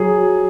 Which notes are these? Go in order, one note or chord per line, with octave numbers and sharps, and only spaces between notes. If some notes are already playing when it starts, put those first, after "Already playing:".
Already playing: F#3 G#4